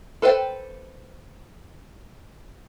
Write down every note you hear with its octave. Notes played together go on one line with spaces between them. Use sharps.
A4 B4 C5 E5 G5